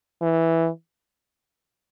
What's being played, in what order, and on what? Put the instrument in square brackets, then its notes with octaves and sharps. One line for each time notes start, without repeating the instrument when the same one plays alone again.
[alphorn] E3